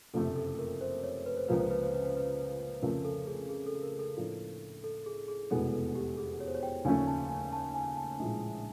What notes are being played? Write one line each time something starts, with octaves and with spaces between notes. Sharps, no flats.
F#1 F2 C3 F3 A3 A4
A4
A#4
C5
C#5
B4
C5
C#2 C#3 F3 A#3 B4
C5
B4
C5
B4
C5
B4
F2 C#3 F3 A3 A#4
A4
G#4
G#4
A4
A#4
A4
A2 F3 A#3 D4
A4
G#4
G#4
F1 E2 B2 G#3 B3 A4
A4
G4
G#4
C#5
C5
C#5
G5
D#2 C#3 F3 A3 C#4 G#5
A5
G#5
A5
G#5
A5
A#1 A2 F3 G#3